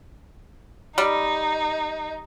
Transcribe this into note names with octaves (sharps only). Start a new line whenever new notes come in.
G3 D#4